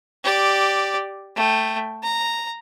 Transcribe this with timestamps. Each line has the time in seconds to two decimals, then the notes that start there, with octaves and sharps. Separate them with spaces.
0.24 G4 D5
1.36 A3 G5
2.03 A#5